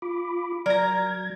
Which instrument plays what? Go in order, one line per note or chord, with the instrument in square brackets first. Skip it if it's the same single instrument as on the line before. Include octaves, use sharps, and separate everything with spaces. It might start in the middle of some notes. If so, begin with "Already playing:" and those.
[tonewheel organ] F4 B5 D6
[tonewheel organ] F#3 G#6 [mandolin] A#4 A#5 [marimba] D5